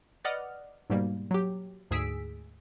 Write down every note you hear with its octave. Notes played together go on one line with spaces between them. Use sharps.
B4 D5 D#5 F#5 F6
G#2 B2 G3 A#3
F#3 G4
D2 G#2 G#4 E6 B6 D7